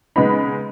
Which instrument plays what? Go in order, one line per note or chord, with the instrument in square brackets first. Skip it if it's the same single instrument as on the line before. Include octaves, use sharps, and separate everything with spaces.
[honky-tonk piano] C#3 G#3 B3 D#4 B5